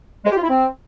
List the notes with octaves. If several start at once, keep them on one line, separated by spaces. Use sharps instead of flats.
G#3
G4
F4
E4
C4